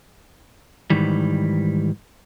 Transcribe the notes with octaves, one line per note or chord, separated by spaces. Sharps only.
G#2 D#3 E3 G3